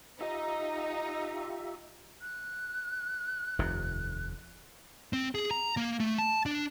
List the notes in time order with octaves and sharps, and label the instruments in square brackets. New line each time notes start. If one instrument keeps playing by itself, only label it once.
[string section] D#4 [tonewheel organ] F4 G4 E5 [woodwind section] D#5
[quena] F#6
[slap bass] F1 D#2 C3
[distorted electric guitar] C4
G#4
A#5
A#3
A3
A5
D4